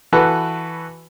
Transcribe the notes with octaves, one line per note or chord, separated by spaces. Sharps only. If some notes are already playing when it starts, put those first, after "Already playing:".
E3 F#4 A4 B4